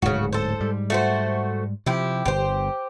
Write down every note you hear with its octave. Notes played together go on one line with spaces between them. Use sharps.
D1 G#2 C#3 F#4
A4 C5
G#2 G3
A3 F#4 C5
C3 F3 E4 G4
G1 G4 C5